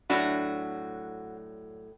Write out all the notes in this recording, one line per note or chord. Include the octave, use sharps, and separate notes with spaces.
A2 F#3 D4 F#4